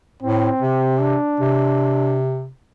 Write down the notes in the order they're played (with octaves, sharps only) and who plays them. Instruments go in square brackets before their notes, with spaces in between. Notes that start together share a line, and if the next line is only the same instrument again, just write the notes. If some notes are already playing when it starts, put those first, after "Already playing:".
[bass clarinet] A2 [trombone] C4
[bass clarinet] C3
[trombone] D4
[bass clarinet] C3